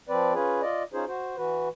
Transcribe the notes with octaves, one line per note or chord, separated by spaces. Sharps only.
F3 C4 B4 D5
C#4 F4 G#4 B4
F4 D5 D#5
C#4 D#4 F4 G#4 C5
F#4 C5
E3 F#4 B4